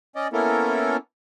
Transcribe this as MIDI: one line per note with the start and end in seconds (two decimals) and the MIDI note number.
0.16 0.28 61
0.16 0.28 74
0.16 0.28 75
0.33 0.97 58
0.33 0.97 59
0.33 0.97 61
0.33 0.97 64
0.33 0.97 69
0.33 0.97 70